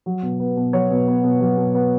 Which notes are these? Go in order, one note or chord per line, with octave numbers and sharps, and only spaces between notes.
F#3
B2
B3
B2
F#3 C#5
B2
B3
B2
F#3
B2
B3